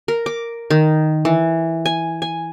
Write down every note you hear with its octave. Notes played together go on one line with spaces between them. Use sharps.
A#4
D6
D#3
E3
G#5
G#5